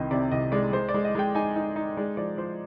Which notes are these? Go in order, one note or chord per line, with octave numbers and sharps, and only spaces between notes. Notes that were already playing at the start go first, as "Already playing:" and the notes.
Already playing: C2 C3 D#3 D#5
C3 D5
C2 D#5
G#3 D5
G#3 C5
D5
G#3
D#5
G#3 G5
D#4 G#5
D#4
D#4
G#3 D5
F3 D5
F3 C5